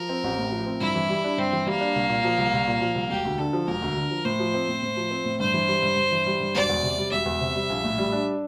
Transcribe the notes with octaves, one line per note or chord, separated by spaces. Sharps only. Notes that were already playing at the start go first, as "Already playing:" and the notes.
Already playing: F3 A#4
C4
A1
A2
F3
C4
G2 E4
E3
G3
D4
G2 C4
E3
G3 A#3
D4
C2
A#2
F3
C2
C2
A#2
F3
C2
E1 G4
D2
D3 A4
F3
E1 A#4
D2
D3
F3
A2 C5
F3
C4
A2
A2
F3
C4
A2
G2 C5
E3
G3
G2
G2
E3
G3
G2
E1 D5
E2
C3
G3
E1 E5
E2
C3
G3
A#1
A2
G3
D4